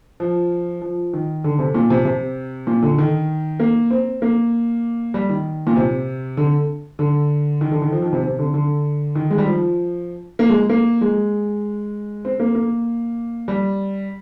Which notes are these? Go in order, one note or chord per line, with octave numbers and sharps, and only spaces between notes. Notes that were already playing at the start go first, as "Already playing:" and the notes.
F3
F3
D#3
D3
C3
A#2
C3
C3
A#2
D3
D#3
A#3
C4
A#3
G3
D#3
A#2
C3
D3
D3
D#3
D3
D#3
F3
D#3
C3
C3
D3
D3
D#3
G#3
G3
F3
A#3
G#3
A#3
G#3
C4
A#3
A#3
G3